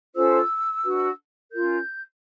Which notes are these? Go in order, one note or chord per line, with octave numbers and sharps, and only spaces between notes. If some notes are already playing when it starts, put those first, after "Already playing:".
C#4 F4 A4 C5 E6
D4 F#4 B4
C#4 F4 A#4 G6